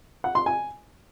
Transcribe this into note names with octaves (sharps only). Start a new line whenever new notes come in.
F#5
C6
G#5